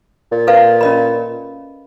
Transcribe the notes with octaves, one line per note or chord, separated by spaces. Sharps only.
A#2
A4 B4 F5
C#4 D#5 B5